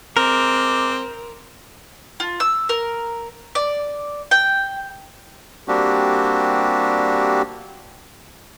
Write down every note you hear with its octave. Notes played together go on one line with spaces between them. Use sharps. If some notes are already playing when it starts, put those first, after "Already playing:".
G#3 C4 A#4 D6
F4
E6
A#4
D5
G5
G3 A#3 C4 D4 F#4 G4